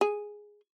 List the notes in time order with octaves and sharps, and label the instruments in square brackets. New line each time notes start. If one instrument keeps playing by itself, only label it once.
[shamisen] G#4